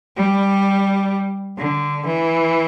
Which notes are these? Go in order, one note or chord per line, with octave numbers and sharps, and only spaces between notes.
G3
D3
E3